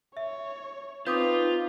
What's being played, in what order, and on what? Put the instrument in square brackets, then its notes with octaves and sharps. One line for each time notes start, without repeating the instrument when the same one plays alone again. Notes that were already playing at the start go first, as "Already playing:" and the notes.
[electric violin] C#5 [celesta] E5
[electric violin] C4 D#4 [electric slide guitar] F4 [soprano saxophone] B4 [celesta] D6 D#6 G6